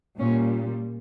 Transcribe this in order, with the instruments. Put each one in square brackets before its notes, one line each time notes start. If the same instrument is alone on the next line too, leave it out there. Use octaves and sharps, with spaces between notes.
[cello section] A#2 G3 C#4